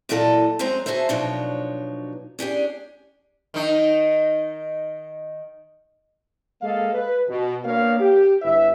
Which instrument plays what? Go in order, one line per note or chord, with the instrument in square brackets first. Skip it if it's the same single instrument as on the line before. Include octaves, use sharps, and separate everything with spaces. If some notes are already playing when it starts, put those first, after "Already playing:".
[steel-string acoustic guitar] A#2 E3 F#3 A4 D#5
F#2 F#3 G#3 C4 C5 A#5
F#4 G#4 A4 C5 E5
B2 F3 F#3 D4 D#4 C#5
C#4 D4 G4 G#4
[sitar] D#3 D#4
[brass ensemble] G#3 A#3 A4 D#5 F5
B4
B2
A#3 B3 D4 A#4 C#5 F5
G4
G1 E4 B4 E5